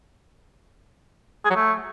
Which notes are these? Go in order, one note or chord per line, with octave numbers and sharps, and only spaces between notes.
G#4
F#3
A3